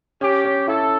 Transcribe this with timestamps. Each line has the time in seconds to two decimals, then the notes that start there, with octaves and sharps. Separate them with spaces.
0.21 C#4 G4
0.45 C#4
0.67 E4 A4